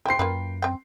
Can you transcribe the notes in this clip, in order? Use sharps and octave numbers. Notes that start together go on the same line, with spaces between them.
E4 C5 G5 C7
F#2 A#3 F4 B4
C4 G5